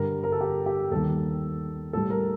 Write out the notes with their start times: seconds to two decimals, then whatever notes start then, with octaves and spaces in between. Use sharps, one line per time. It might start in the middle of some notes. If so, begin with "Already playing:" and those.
Already playing: G2 D3 G3 A#4
0.23 A#4
0.32 A4
0.41 G4
0.66 G4
0.91 D#2 D#3 G3 A4
1.93 A2 G3 A4
2.10 A#4